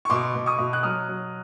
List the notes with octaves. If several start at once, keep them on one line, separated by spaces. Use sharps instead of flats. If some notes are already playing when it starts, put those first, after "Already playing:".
C#6
B2 C6 D6
B2
C#6 D#6
B2
F#6
F#3 D#6 F6
F#3